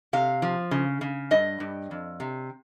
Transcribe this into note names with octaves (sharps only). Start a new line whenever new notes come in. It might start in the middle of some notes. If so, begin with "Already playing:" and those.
C3 F5
F3
C#3
C#3
G2 D#5
G2
F2
C3